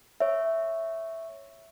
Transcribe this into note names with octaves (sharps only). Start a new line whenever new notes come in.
C#5 E5